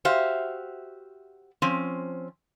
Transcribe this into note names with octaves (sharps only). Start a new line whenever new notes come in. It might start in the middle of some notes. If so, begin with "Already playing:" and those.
F#4 G4 C5 E5 F5
F3 C4 C#4